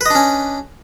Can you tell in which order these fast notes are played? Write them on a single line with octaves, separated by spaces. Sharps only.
B4 D#5 D4 C#4